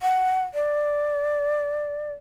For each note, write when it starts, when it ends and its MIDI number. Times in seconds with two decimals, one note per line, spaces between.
0.02 0.44 78
0.54 2.12 74